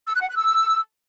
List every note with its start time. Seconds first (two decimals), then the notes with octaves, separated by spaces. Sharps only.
0.07 E6
0.14 F#6
0.22 F#5
0.29 F#6
0.37 E6